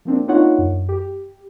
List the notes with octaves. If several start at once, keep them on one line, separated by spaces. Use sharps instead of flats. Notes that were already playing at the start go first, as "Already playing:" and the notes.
F3 A#3 C4 D4
A#3 D4 D#4 F4 C#5 F#5
F#2
G4